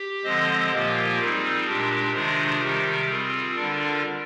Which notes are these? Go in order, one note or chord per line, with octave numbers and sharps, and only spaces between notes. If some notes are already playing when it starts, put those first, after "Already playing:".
Already playing: G4
D3 F3 G#3 C4 C5 D#5
A#2 F3 A#3 F4 G4 A#4
G3 C4 D#4 F4 G#4
A#2 G#3 D4 G4 A#4
C3 D#3 G#3 D4 F4 G#4 C5
C3 D#3 G3 G4 A#4
G3 C4 F4 G#4
D3 G3 D4 F4 A#4 D5